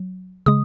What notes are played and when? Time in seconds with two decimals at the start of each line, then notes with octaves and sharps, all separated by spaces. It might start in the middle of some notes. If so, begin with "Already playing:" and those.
Already playing: F#3
0.46 C#3 G#3 D#6